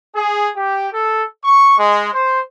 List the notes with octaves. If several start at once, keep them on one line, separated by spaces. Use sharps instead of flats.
G#4
G4
A4
C#6
G#3
C5